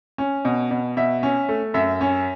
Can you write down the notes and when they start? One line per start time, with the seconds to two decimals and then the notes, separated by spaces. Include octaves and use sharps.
0.18 C#4
0.45 B2
0.71 B2
0.97 B2 E5
1.23 C#4
1.49 A3
1.74 F#2 E5
2.01 C#4